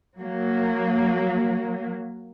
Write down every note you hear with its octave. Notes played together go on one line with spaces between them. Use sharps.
F#3 A#3